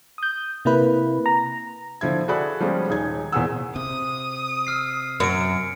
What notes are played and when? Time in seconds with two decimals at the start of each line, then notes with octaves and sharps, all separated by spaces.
0.18 D#6 G6
0.65 C3 A#3 E4 B4
1.26 A#5
2.01 D3 F3 E4 G#6
2.28 F#4 G#4 A4 D5 B5 F#6
2.60 F3 G3 G#3 C#4
2.89 D#1 D#4 G#4 G#6
3.32 E2 A#2 C4 G#4 F#5 E6
3.76 C3 D#6
4.67 E6 F6 C7
5.20 F#2 C#7 D7